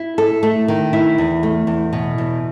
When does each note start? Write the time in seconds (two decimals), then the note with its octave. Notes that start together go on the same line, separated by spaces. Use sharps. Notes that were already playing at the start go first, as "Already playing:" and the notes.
Already playing: E4
0.18 A4
0.43 A3
0.68 D#3
0.93 E4
1.18 E2
1.43 A3
1.67 E2
1.93 B2
2.18 E2